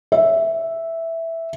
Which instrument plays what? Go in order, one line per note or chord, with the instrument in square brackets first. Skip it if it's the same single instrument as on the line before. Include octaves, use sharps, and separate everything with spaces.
[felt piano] E5